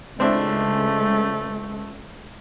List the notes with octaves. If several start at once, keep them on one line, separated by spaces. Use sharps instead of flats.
C#2 A3 C4 D4 E4